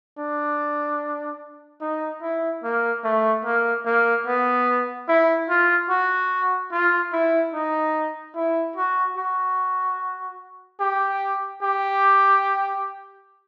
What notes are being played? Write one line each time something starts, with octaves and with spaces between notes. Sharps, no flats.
D4
D#4
E4
A#3
A3
A#3
A#3
B3
E4
F4
F#4
F4
E4
D#4
E4
F#4
F#4
G4
G4